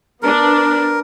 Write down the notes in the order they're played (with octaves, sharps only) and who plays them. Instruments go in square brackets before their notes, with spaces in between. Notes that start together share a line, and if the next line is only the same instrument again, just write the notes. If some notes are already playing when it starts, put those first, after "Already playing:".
[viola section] B3 D4 [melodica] A#4